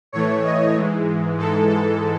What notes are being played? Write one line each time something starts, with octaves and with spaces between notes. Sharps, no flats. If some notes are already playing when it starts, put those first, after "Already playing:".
A2 E3 A3 C#5
D#5
G#2 E3 G#3
G#2 E3 G#3 A4
A4